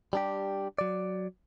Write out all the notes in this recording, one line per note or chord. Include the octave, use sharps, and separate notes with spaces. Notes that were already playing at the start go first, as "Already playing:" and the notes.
G3 D4 G4
F#3 D5